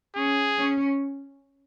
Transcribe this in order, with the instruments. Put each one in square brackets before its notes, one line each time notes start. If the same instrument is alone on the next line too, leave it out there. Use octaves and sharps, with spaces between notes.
[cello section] C#4 [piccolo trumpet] G#4
[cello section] C#4